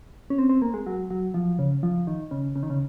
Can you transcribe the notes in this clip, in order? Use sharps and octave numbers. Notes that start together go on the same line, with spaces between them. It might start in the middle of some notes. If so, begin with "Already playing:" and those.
C#4
C4
C4
A#3
G#3
F#3
F#3
F3
C#3
F3
D#3
C#3
C#3
D#3
C#3